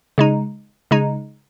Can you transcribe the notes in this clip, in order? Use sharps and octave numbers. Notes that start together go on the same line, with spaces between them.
C#3 G#3 D#4
C#3 G#3 D#4